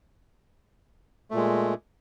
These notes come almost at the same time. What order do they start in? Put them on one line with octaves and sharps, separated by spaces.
A3 A#2 G#3